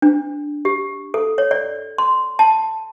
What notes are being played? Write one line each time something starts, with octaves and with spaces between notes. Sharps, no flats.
D4
G4
A4
C#5
D5
C6
A5